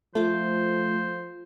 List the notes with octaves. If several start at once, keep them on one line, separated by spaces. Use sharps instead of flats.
F3 A3 F4 C5 D6